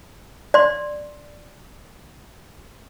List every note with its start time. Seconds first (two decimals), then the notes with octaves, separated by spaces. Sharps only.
0.54 D5 C6